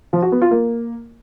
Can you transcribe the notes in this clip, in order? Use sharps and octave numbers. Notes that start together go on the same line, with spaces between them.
F3
F#4
B3
F4
A#3